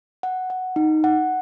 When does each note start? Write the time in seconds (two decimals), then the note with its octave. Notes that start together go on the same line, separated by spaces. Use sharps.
0.23 F#5
0.50 F#5
0.76 D#4
1.04 F#5